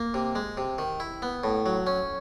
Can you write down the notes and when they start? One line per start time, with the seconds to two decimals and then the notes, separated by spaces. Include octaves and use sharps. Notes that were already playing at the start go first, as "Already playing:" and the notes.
Already playing: A#3
0.14 C3
0.35 G#3
0.57 C3
0.78 D#3
1.00 E4
1.22 B3
1.44 A2
1.66 F#3
1.87 C#4